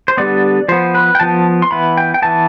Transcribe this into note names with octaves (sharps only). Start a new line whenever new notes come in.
C5
D3 G3 B3 D5
F3 B3 C5
B4
G5
F3 B3 A5
C6
E3 B3 B5
G5
G5
E3 B3 A5